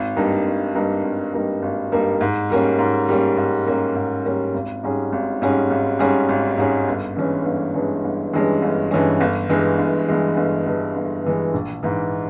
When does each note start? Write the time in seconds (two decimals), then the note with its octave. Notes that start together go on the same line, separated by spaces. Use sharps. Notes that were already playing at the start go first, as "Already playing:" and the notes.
Already playing: G#1
0.16 G2 G3 A#3 D#4
0.46 G#1
0.75 G2 G3 A#3 D#4
1.04 G#1
1.34 G2 G3 A#3 D#4
1.62 G#1
1.92 G2 G3 A#3 D#4
2.21 G#2
2.50 G3 A#3 C#4
2.79 G#2
3.08 G3 A#3 C#4
3.37 G#2
3.66 G3 A#3 C#4
3.95 G#2
4.25 G3 A#3 C#4
4.54 G#1
4.83 G#2 G3 C#4 G#4
5.12 G#1
5.42 G#2 G3 C#4 G#4
5.70 G#1
5.99 G#2 G3 C#4 G#4
6.29 G#1
6.57 G#2 G3 C#4 G#4
6.87 G1
7.16 G2 E3 G#3 C#4
7.46 G1
7.74 G2 E3 G#3 C#4
8.04 G1
8.33 G2 E3 G#3 C#4
8.62 G1
8.91 G2 E3 G#3 C#4
9.21 G1
9.49 G2 E3 G#3
9.79 G1
10.08 G2 E3 G#3
10.37 G1
10.66 G2 E3 G#3
10.96 G1
11.24 G2 E3 G#3
11.54 A#1
11.83 G#2 E3